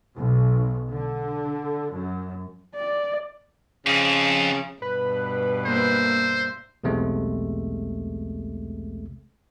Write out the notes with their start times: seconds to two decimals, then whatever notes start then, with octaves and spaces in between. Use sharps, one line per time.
0.15 B1
0.92 D3
1.94 F#2
2.75 D5
3.86 F2 C#3
4.82 G2 B2 B4
5.66 A#3 C5 E5
6.84 B1 E2 C3 G#3 A3